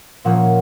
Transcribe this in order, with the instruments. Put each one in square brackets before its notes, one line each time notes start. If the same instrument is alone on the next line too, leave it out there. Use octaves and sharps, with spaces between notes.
[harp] A#2 F3 A#3 C#4 F#5